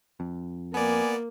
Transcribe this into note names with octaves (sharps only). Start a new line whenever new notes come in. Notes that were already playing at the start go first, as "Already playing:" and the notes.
F2
A#3 B3 D5 G#5